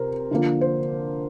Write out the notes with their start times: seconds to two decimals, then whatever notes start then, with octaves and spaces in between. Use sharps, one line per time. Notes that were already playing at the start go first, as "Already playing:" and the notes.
Already playing: C3 A#4 C5
0.31 D3 F3 A#3
0.61 C5